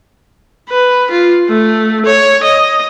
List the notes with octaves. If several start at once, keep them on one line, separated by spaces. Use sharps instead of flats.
B4
F4
A3
C#5
D#5